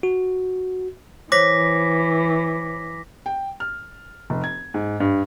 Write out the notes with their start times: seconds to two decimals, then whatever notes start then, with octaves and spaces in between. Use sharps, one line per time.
0.03 F#4
1.32 E3 C5 C#5 D6 A#6 B6
3.26 G5
3.60 F6
4.30 F1
4.44 G#6
4.74 G#2
5.00 G2